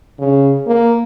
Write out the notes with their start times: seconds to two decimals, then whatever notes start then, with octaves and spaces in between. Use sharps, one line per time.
0.19 C#3
0.67 A#3